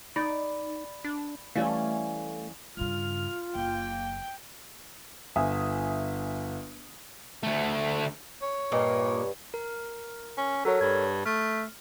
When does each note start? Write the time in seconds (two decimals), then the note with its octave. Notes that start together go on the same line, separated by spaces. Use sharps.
0.16 D#4 D5 B5
1.04 D4
1.55 E3 G3 A3 C#4 F5
2.77 G2 C#3 F4 F6
3.55 F#1 A#3 G5
5.36 G1 E5 G#5 D#6
7.43 D2 A3
8.42 C#5
8.72 G2 A#2 A#3 D#5
9.54 A#4
10.37 C#4
10.65 F#3 A4 A#4 C#5
10.81 G2 G#6
11.25 A3 F6